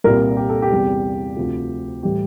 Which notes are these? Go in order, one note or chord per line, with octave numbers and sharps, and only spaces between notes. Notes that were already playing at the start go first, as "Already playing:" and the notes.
C2 A#2 G3 A#4
G4
A4
G4
E2 C3 G3
D2 C3 F3
A2 E3 G3 G4